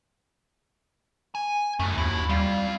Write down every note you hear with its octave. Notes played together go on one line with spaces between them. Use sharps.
G#5
C#2 F#2 A3
D#2 E4 F#4
G3 C4 F5